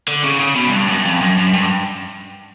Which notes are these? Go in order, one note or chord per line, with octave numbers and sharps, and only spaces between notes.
D3
C#3
C#3
B2
F#2
G2
F#2
F2
F#2
F#2
G2